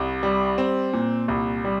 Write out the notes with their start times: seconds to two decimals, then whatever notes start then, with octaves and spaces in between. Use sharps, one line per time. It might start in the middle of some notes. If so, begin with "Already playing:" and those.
Already playing: C2
0.23 G3
0.58 C4
0.93 A#2
1.28 C2
1.65 G3